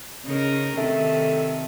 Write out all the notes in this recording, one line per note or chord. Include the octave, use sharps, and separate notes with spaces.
C#3 D#4 A#4
C3 D#3 A3